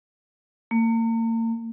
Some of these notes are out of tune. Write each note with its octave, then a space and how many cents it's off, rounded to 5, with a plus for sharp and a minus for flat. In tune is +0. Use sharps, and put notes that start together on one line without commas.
A#3 -40